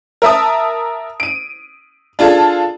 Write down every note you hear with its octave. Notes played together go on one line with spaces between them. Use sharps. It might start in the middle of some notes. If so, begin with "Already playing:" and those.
A#4 E5 A5 D#6
D7 D#7
D4 F4 G#4 A4 A5